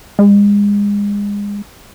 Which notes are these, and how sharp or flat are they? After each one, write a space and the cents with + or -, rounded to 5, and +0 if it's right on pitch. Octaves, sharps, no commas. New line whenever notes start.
G#3 -30